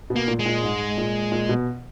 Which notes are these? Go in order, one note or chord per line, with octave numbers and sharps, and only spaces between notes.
B2
A#3
A#2
G#3
A#2
G#2
A#2
A#2
B2